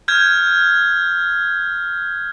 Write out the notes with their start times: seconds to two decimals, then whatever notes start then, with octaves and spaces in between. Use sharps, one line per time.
0.08 F6 G6 G#6